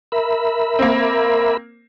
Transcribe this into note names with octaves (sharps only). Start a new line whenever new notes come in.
A#4 E5 B5
A#3 C4